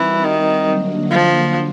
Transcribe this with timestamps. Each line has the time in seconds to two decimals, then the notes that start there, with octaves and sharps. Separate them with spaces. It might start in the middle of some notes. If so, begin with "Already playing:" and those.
Already playing: E3 G3 C4 D#4 F#4 A#4
0.24 D#3
0.68 D3 F#3 A#3 D4 F#4
1.11 F3